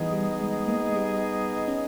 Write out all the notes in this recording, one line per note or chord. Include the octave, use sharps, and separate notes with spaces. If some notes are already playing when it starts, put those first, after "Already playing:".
Already playing: E3 G3 B3 D#4 G#4 D#5
G3
G#3
A#3
G#3
G3
C#4